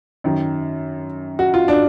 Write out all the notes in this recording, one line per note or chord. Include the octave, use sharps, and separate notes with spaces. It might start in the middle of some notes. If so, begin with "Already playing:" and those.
F#2 D#3
F#4
F4
D4